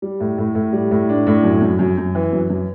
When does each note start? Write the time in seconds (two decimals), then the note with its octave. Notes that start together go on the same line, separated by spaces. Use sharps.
0.02 G3
0.20 A2
0.38 A2
0.55 A2
0.73 G3
0.91 A2
1.09 D4
1.27 A2
1.44 F#2
1.61 F#2
1.79 F#2
1.98 F#2
2.15 E3
2.32 F#2
2.50 F#2